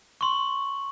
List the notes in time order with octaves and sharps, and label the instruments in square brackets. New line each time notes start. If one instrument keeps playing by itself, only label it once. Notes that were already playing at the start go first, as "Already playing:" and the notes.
[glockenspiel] C6 C#6